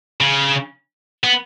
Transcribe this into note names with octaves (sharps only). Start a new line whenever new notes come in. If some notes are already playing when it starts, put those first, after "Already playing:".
C#3
B3